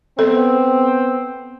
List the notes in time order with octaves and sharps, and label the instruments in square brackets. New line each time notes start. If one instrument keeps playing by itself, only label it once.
[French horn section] B3 [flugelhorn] C4 [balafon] A4